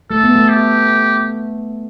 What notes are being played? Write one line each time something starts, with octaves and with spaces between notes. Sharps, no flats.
A3 A4
B3
A3
G4